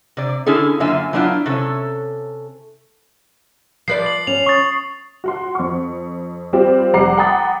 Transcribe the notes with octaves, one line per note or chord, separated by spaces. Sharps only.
C3 D5
D3 C#4 E4 G#4 A4
F#2 D3 A#3 F4 E5 G#5
F#3 B3 D4 E4 F4
C3 C#4 A4
F3 B4 D5 C7
F#7
C#4 F7
C#6 D#6 A6
F#4 F#5 C6
F2 C#6
G3 C4 F4 G4
F1 G3 F#5 A#5 D6 C7
F#5 G5 A#5 B5 D#6 A6